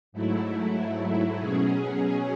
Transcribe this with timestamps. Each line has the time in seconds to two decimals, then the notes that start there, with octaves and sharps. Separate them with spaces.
0.12 G#2 F#3 A3 E4
1.38 B2 F#3 C#4 G#4